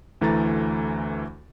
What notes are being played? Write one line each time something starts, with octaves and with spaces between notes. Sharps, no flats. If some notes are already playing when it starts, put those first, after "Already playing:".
D2 E3 A3 A#5 A6